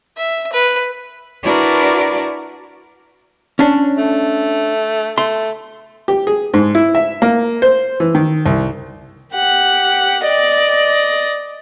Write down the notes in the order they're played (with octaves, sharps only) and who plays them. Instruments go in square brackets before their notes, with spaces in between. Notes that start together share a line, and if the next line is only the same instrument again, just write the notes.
[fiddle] E5
B4
[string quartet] D4 E4 F#4 A#4 B4 D5
[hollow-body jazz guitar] C#4 D4 C#5
[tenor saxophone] A3
[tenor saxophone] A3 [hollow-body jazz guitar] C6
[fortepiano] G4
G#4
G#2
E4
E5
A#3
C5
E3
D#3
C2
[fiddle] G4 F#5
D5 D#5